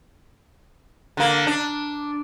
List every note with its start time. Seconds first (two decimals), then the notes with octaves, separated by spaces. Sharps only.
1.17 D3 A#3
1.47 D4